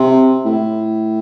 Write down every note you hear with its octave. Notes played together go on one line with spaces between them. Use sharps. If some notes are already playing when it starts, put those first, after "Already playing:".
Already playing: C3
A2